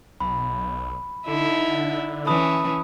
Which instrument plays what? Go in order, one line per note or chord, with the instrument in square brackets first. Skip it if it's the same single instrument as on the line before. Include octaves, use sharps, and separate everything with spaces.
[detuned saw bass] B1 [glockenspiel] B5
[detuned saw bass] D3 [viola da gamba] D#4 E4
[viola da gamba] E3 C#4 [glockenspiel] A5 B5 D#6